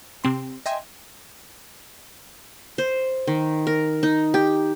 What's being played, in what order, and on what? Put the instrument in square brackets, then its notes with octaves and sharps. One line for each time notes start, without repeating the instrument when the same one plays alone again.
[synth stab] C3 C4 C6
D#5 E5 G5 G#5 C6
[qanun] C5
D#3
A#4
D#4
G4